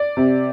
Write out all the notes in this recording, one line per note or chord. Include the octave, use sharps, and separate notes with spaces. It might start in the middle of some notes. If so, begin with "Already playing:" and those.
Already playing: D5
C3